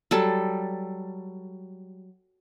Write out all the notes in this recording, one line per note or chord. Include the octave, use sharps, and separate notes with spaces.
F#3 G3 A4